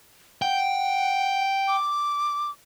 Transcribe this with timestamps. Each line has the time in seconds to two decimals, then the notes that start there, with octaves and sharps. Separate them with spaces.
0.42 F#5 G5
1.68 D6